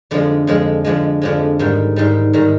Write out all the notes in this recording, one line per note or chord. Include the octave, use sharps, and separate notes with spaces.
F2 D3 F3 G#3
F2 D3 F3 G#3
F2 D3 F3 G#3
F2 D3 F3 G#3
G#2 D#3 G3
G#2 D#3 G3
G#2 D#3 G3